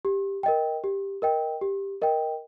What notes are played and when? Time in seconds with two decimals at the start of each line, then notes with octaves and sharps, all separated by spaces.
0.05 G4
0.43 A#4 D#5 G5
0.84 G4
1.22 A#4 D#5 G5
1.61 G4
2.02 A#4 D#5 G5